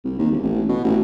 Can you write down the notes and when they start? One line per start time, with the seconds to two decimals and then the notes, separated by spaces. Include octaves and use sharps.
0.05 C2
0.18 D#2
0.31 E1
0.43 A1
0.69 B2
0.84 A1